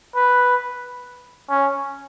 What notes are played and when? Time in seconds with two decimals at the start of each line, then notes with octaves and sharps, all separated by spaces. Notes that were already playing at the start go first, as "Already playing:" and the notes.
0.15 B4
1.50 C#4